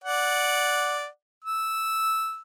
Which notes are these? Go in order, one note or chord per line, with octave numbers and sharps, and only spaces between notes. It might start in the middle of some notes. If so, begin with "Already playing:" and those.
D5 F#5
E6